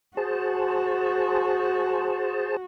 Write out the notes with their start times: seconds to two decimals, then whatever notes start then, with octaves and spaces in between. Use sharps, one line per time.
0.17 F#4 G#4 C5 A5